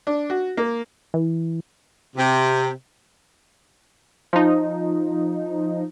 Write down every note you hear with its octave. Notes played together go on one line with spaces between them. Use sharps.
D4
F#4
A#3
E3
C3
F3 D#4